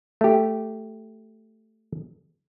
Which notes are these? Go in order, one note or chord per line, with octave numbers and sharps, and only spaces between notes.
A3 G4